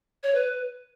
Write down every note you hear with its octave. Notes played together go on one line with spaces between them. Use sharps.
C#5
B4